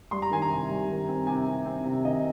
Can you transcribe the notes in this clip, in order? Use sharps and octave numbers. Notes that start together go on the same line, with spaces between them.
G3 C6
A#5
D#3 G#5
A#5
C3
G3
D#3
C4
C3 G#5
C3
C4
C3
D#3 D#5